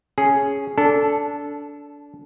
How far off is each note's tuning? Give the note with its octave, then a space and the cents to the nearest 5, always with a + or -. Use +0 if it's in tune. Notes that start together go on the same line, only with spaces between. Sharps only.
C#4 +0 G#4 +0
D4 -20 A4 +0